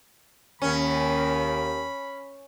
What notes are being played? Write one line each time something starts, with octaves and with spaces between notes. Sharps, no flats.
D#2 D#3 C#4 B5